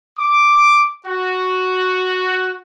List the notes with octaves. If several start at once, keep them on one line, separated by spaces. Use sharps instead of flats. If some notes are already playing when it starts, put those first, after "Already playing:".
D6
F#4